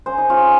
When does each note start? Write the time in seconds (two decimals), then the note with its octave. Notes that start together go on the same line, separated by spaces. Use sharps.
0.06 C#3 G#4 C5
0.18 D#4
0.29 G#3 C#4 F4